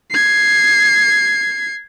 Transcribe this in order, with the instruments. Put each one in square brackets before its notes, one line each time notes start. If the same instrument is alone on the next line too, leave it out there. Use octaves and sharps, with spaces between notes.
[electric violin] G#6 C7